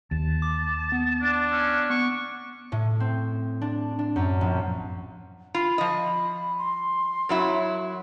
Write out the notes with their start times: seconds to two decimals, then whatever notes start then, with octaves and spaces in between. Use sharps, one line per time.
0.11 D#2 A5
0.42 D6
0.92 B3
1.22 D4
1.52 C#4
1.90 B3 C#6
2.72 A2
3.00 C4
3.62 D4
3.99 D4
4.16 F#2
4.41 A#1
5.55 F4 B5
5.78 F3 D#5
6.59 C6
7.29 F#2 F#3 E4